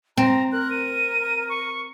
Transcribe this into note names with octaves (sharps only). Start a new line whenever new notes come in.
C4 A#5
A#4 F#6
D#7
C#6